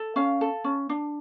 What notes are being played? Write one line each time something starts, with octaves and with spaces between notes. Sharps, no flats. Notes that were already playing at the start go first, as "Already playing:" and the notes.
Already playing: A4
C#4 F5
A4
C#4
D4